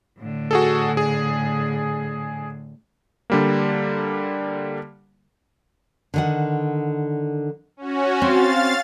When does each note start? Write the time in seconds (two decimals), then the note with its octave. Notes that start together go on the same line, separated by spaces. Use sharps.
0.18 A2 D3
0.51 F#4 G#4 A4
0.97 G#4
3.30 D3 G3 A#3
6.14 D3 D#3 F#5
7.77 C#4 F#4
8.22 C4 F5 A6